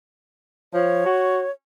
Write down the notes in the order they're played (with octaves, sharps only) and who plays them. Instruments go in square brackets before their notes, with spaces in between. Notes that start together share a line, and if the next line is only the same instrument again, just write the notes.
[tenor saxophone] F3 [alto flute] C#5
[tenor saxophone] F#4